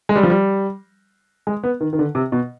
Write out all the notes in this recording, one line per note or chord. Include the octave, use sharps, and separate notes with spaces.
G#3
G3
F3
G3
G#3
B3
D#3
D#3
D3
C3
B2